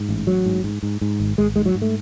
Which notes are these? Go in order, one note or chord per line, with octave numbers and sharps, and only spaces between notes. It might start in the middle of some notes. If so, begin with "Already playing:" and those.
Already playing: G#2
A1
A1 F#3
G#2
G#2
G#2
G#2
G#1
G#1 G#3
G#2 G#3
F#3
G#2
A3